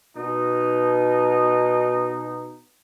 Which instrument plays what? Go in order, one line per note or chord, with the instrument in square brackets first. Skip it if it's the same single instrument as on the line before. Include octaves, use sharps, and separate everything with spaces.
[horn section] B2 D#4